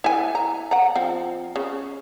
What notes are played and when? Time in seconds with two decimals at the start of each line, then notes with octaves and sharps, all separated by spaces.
0.04 E4 G#5
0.35 A#5
0.71 F#5 A#5
0.95 F3 C4
1.56 C#3